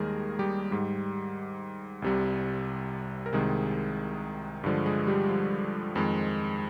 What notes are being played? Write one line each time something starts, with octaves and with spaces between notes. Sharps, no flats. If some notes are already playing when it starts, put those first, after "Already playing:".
Already playing: D#2 D#3 G3 G#3 A#3 G#4 A#4
G3 G4
G#2 G3
C2 C3 G3
A#4
C2 C3 D#3 G#3 G#4
G2 D3 F3 G#3
G#3 G#4
G3 G4
F3 F4
F2 D#3 G#3